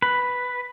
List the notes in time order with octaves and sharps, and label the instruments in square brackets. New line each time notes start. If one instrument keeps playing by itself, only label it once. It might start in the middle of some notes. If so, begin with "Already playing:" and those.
[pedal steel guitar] B4